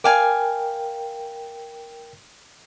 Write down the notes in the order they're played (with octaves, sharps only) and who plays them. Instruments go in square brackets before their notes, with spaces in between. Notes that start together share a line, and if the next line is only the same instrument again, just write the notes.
[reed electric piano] A#4 G5 [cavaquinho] D5 F5 G#5